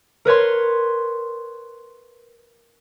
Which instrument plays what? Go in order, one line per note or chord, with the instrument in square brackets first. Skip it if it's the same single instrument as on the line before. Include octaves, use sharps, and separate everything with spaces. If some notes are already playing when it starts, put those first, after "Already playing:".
[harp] A#4 B4 C#5 C6